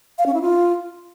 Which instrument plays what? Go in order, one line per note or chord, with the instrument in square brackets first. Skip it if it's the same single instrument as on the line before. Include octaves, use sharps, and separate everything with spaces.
[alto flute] F5
C#4
E4
F4